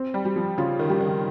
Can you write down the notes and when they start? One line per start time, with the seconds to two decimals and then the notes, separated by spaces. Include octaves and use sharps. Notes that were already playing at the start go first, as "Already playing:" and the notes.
Already playing: C4
0.14 G3
0.25 G3
0.36 F3
0.58 C#3 F4
0.79 D#3
0.89 G3
1.01 D#3